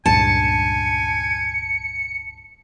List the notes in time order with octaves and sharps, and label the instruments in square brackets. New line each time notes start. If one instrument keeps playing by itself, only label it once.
[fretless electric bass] C#2 G2 A#2 [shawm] G#5 [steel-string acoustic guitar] A5 [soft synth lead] C#7